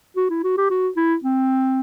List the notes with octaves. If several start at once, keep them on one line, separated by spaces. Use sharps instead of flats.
F#4
E4
F#4
G4
F#4
E4
C4